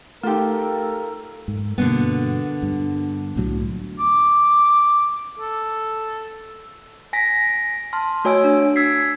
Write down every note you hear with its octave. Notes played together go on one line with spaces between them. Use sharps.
A3 D#4 F4 G4 A4 A#4
G#2
G2 B2 D3 A#3 B3
G2
C2 A2 F#3
D6
A4
G#5 A#6 B6
A5 C6 F6
A3 F#4 C#5 G#5 E6
D4
E6 G#6 B6 C7